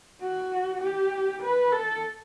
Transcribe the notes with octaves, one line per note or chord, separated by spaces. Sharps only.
F#4
G4
B4
A4